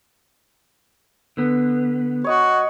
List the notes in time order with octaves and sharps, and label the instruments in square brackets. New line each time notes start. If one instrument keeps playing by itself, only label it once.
[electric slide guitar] D3 B3
[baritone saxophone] F#4 [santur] C#5 D#5 C#6